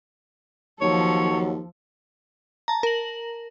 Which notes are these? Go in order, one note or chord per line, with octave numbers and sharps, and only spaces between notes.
D#2 F3 F#3 A4 C#5
A5 A#5
A#4 F#7